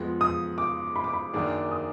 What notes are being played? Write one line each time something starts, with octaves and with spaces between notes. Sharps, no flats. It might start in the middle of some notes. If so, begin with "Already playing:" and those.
Already playing: F2 F3 G#3 B3
D#6
D6
B5
D6
B5
F#2 D#3 A#3 D4 G#4 D6
D#6